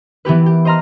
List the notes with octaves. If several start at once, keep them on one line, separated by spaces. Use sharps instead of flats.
E3 B3 G4 B4
G4
C5 D#5 A#5 C6 F6